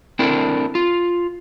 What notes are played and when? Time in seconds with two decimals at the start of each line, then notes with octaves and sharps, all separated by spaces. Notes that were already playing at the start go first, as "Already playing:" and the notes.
0.19 C4 D4 E4 A4 A#4
0.75 F4